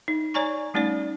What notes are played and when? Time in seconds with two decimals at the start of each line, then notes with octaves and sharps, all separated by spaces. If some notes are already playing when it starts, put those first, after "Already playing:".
0.08 D#4
0.34 C#5 D5 G#5 A#5 C#6
0.74 G3 A3 C#4 D#4 D5